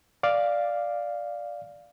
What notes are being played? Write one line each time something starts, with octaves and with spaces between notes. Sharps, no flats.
D5 F5